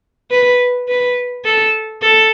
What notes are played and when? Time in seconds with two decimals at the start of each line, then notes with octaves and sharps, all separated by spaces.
0.31 B4
0.88 B4
1.45 A4
2.02 A4